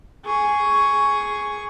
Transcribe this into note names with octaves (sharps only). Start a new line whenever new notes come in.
G#4 C#6